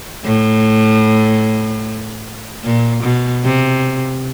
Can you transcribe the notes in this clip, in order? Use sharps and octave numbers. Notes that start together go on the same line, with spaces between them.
A2
A#2
B2
C3